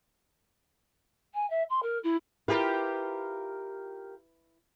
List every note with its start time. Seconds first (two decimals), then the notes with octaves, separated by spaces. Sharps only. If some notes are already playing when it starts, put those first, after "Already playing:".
1.34 G#5
1.50 E5
1.70 C6
1.83 A#4
2.04 E4
2.48 E4 F4 G4 A#4 B4